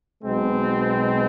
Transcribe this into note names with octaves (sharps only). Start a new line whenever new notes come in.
B1 B2 G#3 C4